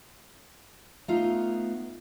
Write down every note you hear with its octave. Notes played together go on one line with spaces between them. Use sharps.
A3 B3 D#4 F4